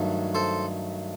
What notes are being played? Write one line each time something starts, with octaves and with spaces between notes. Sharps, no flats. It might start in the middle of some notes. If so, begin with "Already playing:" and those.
Already playing: G2 D#3 F#3 A3
A4 C5